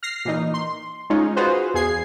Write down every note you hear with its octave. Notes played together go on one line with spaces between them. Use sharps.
F6 A#6 C7
A#2 E3 D#4
C6
G#3 C#4 D#4 F4
F4 F#4 G#4 B4 C5
E2 G#4 G#6 C7